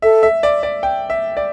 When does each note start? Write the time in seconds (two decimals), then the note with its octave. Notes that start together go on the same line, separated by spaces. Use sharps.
0.02 A4 E5
0.23 E5
0.43 D5
0.63 D5
0.83 G5
1.10 E5
1.37 D5